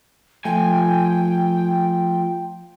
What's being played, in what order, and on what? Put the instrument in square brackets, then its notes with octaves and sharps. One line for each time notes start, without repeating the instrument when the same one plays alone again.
[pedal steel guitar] F3 [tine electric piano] A3 [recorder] G5 [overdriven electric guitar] G#5